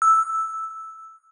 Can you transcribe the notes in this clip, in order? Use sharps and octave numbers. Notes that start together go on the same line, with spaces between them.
E6